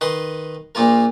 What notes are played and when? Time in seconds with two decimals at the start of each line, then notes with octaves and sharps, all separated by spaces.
0.01 D#3 B4 D#5 C6 D#6
0.75 A#1 A#2 A#3 F4 A#4